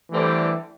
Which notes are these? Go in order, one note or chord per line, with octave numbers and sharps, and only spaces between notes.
D3 E3 G3 A3 C4 G4 D5